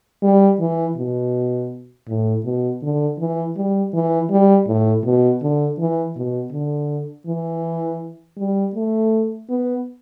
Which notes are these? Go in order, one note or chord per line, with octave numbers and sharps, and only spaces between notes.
G3
E3
B2
A2
B2
D3
E3
G3
E3
G3
A2
B2
D3
E3
B2
D3
E3
G3
A3
B3